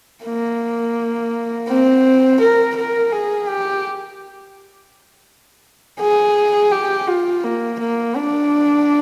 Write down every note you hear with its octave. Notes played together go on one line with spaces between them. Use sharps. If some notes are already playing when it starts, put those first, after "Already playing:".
A#3
C4
A#4
A#4
G#4
G4
G#4
G4
F4
A#3
A#3
D4